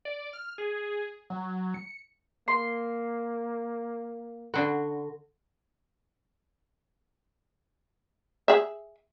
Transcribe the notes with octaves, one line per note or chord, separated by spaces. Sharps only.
D5
F6
G#4
F#3
C#7
A#3 C6
D3 F#4 A4
G#4 E5